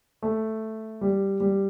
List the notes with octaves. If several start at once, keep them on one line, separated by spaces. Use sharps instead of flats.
A3
G3
G3